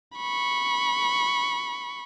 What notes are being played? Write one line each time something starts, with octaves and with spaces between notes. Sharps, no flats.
B5 C#6